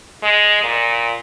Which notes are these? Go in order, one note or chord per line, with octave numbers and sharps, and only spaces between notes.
G#3
A#2